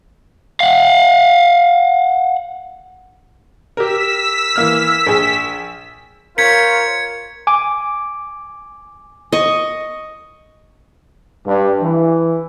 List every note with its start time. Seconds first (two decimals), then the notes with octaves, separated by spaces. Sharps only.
0.60 F5 F#5
3.77 G4 A#4 E6 B6
4.56 E3 A#3 F6
5.07 A#1 G#4
6.38 F4 A#4 C5 C#5 G#6 B6 C#7
7.47 G#5 D6
9.32 D#5 C#6
11.47 G2
11.81 E3